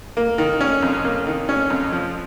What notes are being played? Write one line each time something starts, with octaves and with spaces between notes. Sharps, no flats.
A#3
D#3
C#4
F2
A#3
D#3
C#4
F2
F3